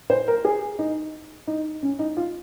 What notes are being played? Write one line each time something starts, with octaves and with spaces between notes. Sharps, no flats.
C5
A#4
G#4
D#4
D#4
C#4
D#4
F4